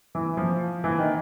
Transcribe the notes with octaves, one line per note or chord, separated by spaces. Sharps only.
E3
F3
E3
D#3